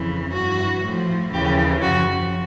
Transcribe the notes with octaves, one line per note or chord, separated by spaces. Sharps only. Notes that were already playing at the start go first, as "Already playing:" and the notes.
Already playing: F2 C#3 E3
G2 E3 F#4
A2 F3
D#2 C#3 E3 G4
F#2 C#3 F3 F#4